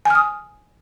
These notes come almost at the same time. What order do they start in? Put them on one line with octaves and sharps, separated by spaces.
G#5 F6 D#6